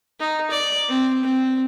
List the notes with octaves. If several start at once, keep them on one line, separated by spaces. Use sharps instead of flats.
D#4
D5
C4
C4